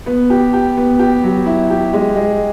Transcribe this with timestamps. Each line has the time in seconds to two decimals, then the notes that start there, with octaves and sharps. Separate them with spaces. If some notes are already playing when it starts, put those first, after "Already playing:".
0.06 B3
0.30 G4
0.53 G4
0.77 B3
0.99 G4
1.24 F#3
1.46 E4
1.70 G4
1.93 G#3
2.16 G#3